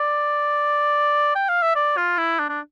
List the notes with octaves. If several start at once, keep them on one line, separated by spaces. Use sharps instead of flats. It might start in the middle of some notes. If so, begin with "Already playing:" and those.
Already playing: D5
G5
F5
E5
D5
F4
E4
D4
D4